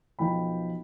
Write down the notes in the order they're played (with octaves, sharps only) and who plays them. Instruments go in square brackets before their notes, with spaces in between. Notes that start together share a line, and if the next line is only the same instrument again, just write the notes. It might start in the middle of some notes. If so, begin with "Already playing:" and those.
[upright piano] B1 F3 G5 B5